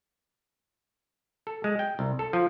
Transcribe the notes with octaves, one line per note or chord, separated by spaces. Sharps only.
A4
G#3
G5
C2
A4
F3